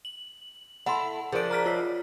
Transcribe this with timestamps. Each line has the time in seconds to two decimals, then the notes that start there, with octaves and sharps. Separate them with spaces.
0.05 F#7
0.86 E4 A4 F#5 C6
1.32 F3 D4 G#4 A#4 D7
1.51 A#5 F6 B6
1.66 F4 C#5 B6